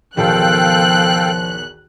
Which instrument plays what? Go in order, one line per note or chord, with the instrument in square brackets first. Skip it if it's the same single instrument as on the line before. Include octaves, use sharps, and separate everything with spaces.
[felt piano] B1 E2 D#3 [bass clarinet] F3 [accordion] A4 F5 G5 [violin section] F#6